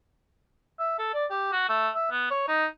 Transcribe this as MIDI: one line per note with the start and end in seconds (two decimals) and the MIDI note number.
0.79 0.95 76
0.98 1.13 69
1.13 1.25 74
1.30 1.49 67
1.52 1.67 66
1.69 1.89 57
1.95 2.11 76
2.11 2.29 59
2.31 2.48 73
2.48 2.65 63